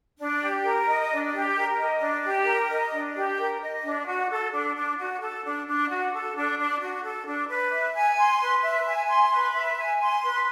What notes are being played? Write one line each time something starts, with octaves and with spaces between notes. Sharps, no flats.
D4
G4
A#4
D#5
D4
G4
A#4
D#5
D4
G4
A#4
D#5
D4
G4
A#4
D#5
D4
F#4
A4
D4
D4
F#4
A4
D4
D4
F#4
A4
D4
D4
F#4
A4
D4
B4
E5
G#5
C6
B4
E5
G#5
C6
B4
E5
G#5
C6
B4